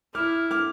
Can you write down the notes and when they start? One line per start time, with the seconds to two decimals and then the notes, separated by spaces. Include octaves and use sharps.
0.14 E4 D6 F6
0.51 D6 F6